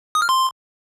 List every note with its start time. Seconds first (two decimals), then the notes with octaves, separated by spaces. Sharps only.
0.15 D#6
0.22 F6
0.29 C6